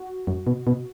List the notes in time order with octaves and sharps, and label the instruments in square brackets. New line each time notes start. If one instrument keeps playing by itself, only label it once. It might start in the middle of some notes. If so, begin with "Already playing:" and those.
Already playing: [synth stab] F#4
[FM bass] F#2
B2
B2